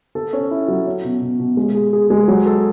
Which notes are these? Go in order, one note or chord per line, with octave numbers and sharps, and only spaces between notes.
A4
C#4
E4
F#3
C#4
B2
B2
B2
G#3
G#4
G#4
G#3
F#3
A4